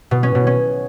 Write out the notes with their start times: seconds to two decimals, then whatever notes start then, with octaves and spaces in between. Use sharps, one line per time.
0.11 B2
0.23 C#4
0.35 B2
0.47 C#4